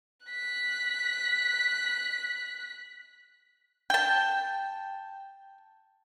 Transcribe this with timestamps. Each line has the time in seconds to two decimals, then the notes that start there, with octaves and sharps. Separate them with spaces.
0.27 F#6 B6
3.90 G5 A5